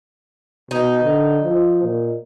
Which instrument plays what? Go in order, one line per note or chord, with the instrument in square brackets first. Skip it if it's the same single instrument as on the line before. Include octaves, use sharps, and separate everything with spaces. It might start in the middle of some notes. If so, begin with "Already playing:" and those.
[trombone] B2 [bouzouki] D#4
[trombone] D3
F3
A#2